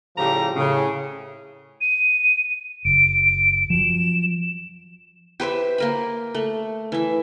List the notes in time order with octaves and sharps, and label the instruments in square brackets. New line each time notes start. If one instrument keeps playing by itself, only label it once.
[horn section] A2 C#3 F3 G3 G4 A#5
A2 C#3
[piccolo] D#7
[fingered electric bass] F#1 [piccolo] D7
[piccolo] D7
[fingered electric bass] F3 F#3 [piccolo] E7
[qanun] G4 B4 C5 E5
A#3 A#4 B5
A3
E3 E5